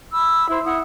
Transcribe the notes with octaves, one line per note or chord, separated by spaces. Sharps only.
B5 E6
E4 C5
E4 F#5 D#6